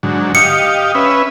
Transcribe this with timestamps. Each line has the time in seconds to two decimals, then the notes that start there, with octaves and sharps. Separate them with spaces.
0.03 G#2 D3 F#3
0.35 G4 D#5 F5 C#7
0.95 C#4 B4 E5